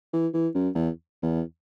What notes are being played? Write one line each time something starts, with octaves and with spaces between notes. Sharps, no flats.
E3
E3
F#2
E2
E2